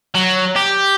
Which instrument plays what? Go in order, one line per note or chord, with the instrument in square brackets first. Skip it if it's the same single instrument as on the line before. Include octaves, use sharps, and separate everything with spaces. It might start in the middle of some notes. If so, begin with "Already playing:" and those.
[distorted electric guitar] F#3
G4